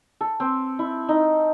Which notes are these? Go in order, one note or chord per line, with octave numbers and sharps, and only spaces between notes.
A4
C4
E4
D#4